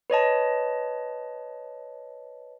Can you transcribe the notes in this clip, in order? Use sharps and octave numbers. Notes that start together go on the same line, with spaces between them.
B4 C#5 D#5 A5